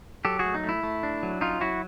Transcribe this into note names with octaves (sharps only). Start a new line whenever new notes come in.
F#3 G4 A4
F#4 G#4
A3
D#4
A3
E4
A3
D4
F#3
C#4 D#4 F4
F#3 E4 F#4